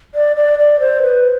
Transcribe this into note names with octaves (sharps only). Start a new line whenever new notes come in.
D5
D5
D5
C5
B4